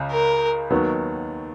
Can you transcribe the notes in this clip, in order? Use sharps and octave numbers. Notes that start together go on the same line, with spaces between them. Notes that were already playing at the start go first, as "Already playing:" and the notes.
Already playing: C#2 C#3
A#4
D#2 D#3 F#3 B3